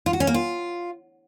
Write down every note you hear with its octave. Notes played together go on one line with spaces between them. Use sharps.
F4
F#4
C#4
A#3
F4